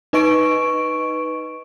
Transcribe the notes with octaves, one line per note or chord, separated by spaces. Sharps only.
D#4 B4 D#5 C#6 D7